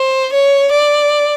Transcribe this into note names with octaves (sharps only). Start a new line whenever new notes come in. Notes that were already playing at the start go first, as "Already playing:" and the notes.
Already playing: C5
C#5
D5